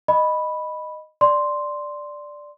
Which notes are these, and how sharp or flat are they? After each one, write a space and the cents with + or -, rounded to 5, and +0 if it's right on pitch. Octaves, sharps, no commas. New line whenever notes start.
D#5 -10 B5 +0
D5 +0 C6 +0